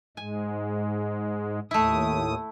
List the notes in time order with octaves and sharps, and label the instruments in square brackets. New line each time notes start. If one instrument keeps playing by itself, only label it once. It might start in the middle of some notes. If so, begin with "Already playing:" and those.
[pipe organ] G#2 G#3 [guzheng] G#5
[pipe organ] D#2 A2 D#6 [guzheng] A3 E4